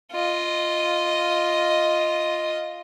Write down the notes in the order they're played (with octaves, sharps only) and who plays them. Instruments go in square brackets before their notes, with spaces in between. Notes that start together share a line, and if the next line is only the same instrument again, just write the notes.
[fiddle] F4 D#5